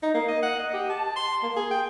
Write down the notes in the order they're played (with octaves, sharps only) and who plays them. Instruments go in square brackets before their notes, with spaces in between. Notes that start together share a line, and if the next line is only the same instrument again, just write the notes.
[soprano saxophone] D#4
A#3
D#5
F#5
D#5
G4
A5
C6
A#3
G#4
G5